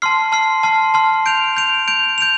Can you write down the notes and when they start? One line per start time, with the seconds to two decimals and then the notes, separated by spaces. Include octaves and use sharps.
0.02 A5 C6 F6 C7
0.32 A5 C6 F6 C7
0.63 A5 C6 F6 C7
0.94 A5 C6 F6 C7
1.26 G6 D7 F7
1.57 G6 D7 F7
1.88 G6 D7 F7
2.18 G6 D7 F7